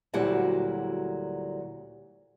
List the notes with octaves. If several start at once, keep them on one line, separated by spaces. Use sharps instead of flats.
D2 A#2 F#3 G3 E4 F#5